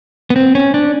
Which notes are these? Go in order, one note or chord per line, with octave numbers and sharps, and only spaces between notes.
B3
C4
C#4
D4